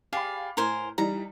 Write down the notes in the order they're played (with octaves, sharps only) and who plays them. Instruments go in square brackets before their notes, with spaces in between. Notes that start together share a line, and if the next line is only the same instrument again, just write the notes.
[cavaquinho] G4 G#4 D5 [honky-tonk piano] F5 B5
[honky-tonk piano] A2 [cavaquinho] A#4 C5 G#5
[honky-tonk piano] E3 G3 D#4 [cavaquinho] A#5